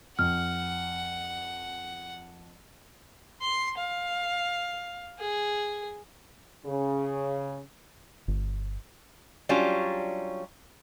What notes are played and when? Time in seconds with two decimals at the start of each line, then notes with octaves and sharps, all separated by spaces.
0.19 F2 F#5 F6
3.41 C6
3.77 F5
5.20 G#4
6.66 C#3
8.28 G1
9.49 F#3 G3 C#4 D4 F4